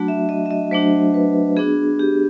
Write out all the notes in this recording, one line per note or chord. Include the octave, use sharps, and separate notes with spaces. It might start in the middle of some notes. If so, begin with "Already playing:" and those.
Already playing: F#3 A3 D4 F#4
E5
D#5
E5
D#5
F#3 A3 D4 F#4 C5
B4
B3 D4 F#4 G#4
G4